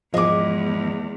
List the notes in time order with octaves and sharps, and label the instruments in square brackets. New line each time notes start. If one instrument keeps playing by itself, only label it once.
[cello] E2 [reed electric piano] G#2 F3 [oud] G#3 G#4 [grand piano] D#5 D6